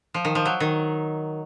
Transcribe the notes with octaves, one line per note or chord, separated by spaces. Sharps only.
F3
D#3
F3
F#3
D#3